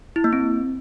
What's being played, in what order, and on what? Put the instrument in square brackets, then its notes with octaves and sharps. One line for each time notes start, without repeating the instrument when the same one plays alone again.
[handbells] E4
A#3
C4